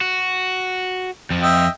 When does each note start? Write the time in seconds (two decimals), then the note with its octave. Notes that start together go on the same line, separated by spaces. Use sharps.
0.01 F#4
1.30 F2 F3
1.42 D#5 E5 G5